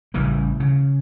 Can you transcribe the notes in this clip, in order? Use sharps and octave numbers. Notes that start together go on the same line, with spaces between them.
A1 C#3 E3 G3
C#3